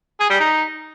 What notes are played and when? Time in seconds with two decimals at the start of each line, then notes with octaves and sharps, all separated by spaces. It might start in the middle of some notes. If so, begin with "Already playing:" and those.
0.20 G#4
0.30 G3
0.40 D#4